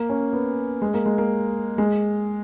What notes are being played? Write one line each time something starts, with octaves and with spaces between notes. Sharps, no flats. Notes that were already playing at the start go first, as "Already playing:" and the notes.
Already playing: A#3
C#4
B3
G#3
A#3
G#3
A#3
G#3